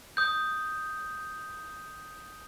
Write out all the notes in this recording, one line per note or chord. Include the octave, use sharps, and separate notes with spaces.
D#6 G6